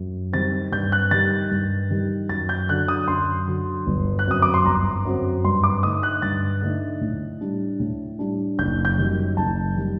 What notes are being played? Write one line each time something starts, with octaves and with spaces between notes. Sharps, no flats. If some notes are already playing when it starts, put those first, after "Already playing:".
Already playing: F#2
D#3 G3 C4 A6
G2 G6
F#6
D#3 G3 A6
G2
D#3 G3
F#2 A6
G6
D3 F#3 F#6
D#6
F#2 C6
D3 F#3
G1
F#6
F#2 F#3 C4 D#6
D6
C6
G1 A#5
F#2 F#3 C4
G2 C6
D6
D3 A3 D#4 D#6
F#6
G2 A6
D3 A3 D#4
A2
G3 D4
A2
G3 D4
F#1 G6
G6
F#2 D#3 G3
F#1 A5
D#3 G3